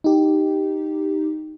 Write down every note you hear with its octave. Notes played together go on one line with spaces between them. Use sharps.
D#4 G4